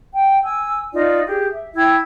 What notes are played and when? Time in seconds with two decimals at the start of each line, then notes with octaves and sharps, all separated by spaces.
0.14 G5
0.44 G#5 E6
0.93 D#4 F4 D5
1.26 G4 G#4
1.51 E5
1.76 E4 G5 E6 G#6